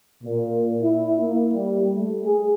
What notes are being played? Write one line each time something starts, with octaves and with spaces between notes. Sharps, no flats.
A#2
E4
A#3
G3
A3
G#4